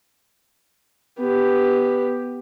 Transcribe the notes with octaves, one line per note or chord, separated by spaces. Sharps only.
B3 G4